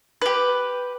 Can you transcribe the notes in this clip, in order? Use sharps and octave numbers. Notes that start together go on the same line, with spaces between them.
G4 B4